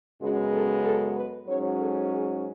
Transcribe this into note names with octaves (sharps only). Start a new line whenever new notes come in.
F#2 C#3 G#3 B3 F#4
A4
A4
B4
G#2 F#3 C#4 C#5
A4
G#4